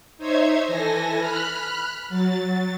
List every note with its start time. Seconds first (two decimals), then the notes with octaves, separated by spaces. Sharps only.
0.18 D#4 C5 C#5 E5 G#6
0.67 E3 A4 G#5 A#6
1.16 B5 F6 F#6
2.09 F#3 A6